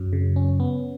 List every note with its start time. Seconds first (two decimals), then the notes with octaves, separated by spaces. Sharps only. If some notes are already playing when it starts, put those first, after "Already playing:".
Already playing: F#2 F#3
0.13 C#3
0.36 C#4
0.60 B3